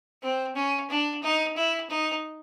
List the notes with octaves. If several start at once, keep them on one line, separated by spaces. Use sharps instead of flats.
C4
C#4
D4
D#4
E4
D#4